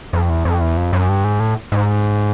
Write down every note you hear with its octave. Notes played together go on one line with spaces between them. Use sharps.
F2
E2
F2
E2
F2
F#2
G2
G#2
A2
G#2